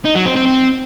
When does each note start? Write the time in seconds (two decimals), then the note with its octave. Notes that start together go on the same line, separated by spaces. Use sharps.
0.05 D#4
0.15 F#3
0.26 C4
0.36 C4
0.46 C4